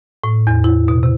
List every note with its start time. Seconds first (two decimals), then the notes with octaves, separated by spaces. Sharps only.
0.24 A2
0.47 E2
0.64 E4
0.88 B2
1.03 C3